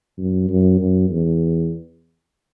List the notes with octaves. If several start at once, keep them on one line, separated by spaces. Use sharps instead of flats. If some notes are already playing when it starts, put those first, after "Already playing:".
F#2
F#2
F#2
E2